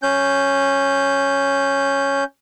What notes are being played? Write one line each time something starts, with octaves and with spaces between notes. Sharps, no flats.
C#4 G6